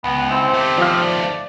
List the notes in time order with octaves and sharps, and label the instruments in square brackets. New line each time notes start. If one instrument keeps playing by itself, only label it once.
[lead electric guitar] C#2 [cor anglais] B3
[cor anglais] C4 [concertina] E4 C5
[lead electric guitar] D#3 A3 [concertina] G4
[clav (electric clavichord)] F3 F5
[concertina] D5